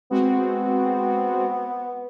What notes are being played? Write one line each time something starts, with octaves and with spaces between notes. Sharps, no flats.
G#3 B3 C4 F#4